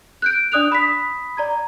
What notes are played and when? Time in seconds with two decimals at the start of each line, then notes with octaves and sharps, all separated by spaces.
0.22 F#6 G6 D7
0.52 D4 D5 D#6 F#6 F7
0.72 B5 D#6 B6
1.37 D5 A#5 G#6